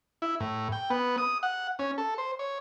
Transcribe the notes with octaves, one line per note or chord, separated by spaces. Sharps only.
E4
A2
G5
B3
D#6
F#5
C#4
A4
C5
C#5